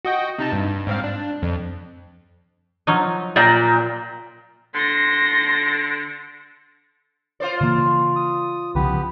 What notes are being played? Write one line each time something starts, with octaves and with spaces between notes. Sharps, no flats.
F#4 D#5 G5
C3 D#4 A5
G2
G#2 C4 F5
D4
F2
F3 F#3 D#4
A#2 D5 G5 A#5
D3 C6 A#6
F4 C5 D5
C#3 E3 A#3
D#6
C2 C#3 F3 B3 G4 B4